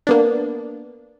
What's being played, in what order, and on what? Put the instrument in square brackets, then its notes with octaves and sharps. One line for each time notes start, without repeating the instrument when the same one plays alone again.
[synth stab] A#3 B3 D4